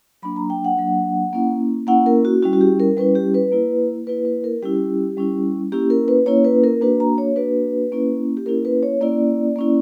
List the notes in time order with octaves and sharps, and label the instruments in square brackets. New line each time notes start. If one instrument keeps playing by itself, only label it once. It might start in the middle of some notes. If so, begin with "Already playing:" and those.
[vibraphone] F#3 A#3 D4 B5
A#5
G5
F#5
F#3 A#3 D4
A#3 C#4 E4
A#3 C#4 E4 F#5
A#4
F#4
G3 C#4 E4 F#4
F#4
G4
A#4
G3 C#4 E4 B4
G4
B4
A#3 E4
A#3 E4 B4
B4
A#4
G3 C#4 E4 G4
G3 C#4 E4
A#3 C#4 E4 G4
A#4
B4
A#3 C#4 E4 C#5
B4
A#4
A#3 D4 F#4 B4
A#5
C#5
A#3 D4 F#4 B4
A#3 C#4 E4
G4
A#3 C#4 E4 A#4
B4
C#5
A#3 C#4 E4 D5
A#3 C#4 E4